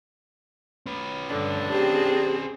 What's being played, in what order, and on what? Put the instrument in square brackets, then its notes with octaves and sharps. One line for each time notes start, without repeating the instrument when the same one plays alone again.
[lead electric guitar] C#4 B4
[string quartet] G2 D3 [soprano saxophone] D4 [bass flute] D5
[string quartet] C4 G#4 C5 [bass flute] G4